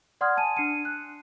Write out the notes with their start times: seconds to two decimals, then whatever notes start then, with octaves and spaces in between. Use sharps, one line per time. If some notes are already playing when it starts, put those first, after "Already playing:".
0.21 D5 F#5 C6 D#6 F6 G#6
0.37 G#5 A5 D#7
0.56 D4 C7 C#7 D#7
0.85 F#6